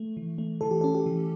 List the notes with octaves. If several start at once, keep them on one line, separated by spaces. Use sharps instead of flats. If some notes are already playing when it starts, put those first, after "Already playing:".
Already playing: A3
E3
A3
E3 A4
G4
A4
C#4
G4
E3